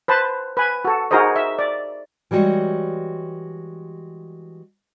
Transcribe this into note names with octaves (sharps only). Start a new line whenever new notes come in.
B4 C5 A5
B4 G#5
F#4 A4
D#4 F#4 G#4 A#4 C5 D#5
E5
D5
E3 G3 G#3 F#4 G4 C#5